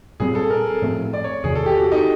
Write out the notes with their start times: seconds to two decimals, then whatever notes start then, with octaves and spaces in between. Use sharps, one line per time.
0.20 A#2 G3 C4 G#4
0.35 A4
0.50 A#4
0.82 A2 F3 A3 C4
1.13 D5
1.24 C#5
1.44 E2 C3 D#3 G#4
1.55 A4
1.66 G4
1.76 F#4
1.92 D#4